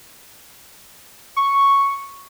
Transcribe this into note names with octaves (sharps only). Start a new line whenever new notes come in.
C#6